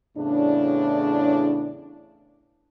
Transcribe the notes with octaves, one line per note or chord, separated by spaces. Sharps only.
E2 A2 C#3 D4